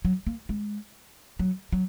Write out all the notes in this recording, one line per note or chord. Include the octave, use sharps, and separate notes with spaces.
F#3
A#3
G#3
F#3
F#3